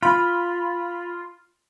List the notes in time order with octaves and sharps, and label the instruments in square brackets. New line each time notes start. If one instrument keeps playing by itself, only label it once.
[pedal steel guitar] F4 [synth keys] B5